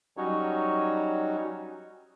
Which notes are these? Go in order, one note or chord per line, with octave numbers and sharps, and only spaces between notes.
F#3 G3 C#4 D#4 F#4 C#5